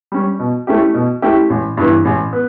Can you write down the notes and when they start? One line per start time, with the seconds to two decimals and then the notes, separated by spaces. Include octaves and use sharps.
0.12 G3 C#4
0.39 B2
0.67 A3 C#4 E4 G4
0.94 B2
1.22 A3 C#4 E4 G4
1.50 A1
1.77 G2 E3 B3
2.05 A1
2.33 B3